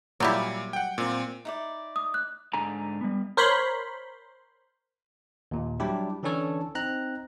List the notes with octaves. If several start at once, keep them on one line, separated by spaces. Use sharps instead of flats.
A#2 F#3 G3 E4
F#5 G5
A#2 C4
D#4 E4 D5
D#6
F#6
G#2 D3 G#5 A#5
G3 B3
A#4 C5 C#5 B5 C6
D#2 A#2
F#3 G3 D4 E4 G4
D3 E3 C#4 D4 A4 C#5
C4 D#4 A#5 F#6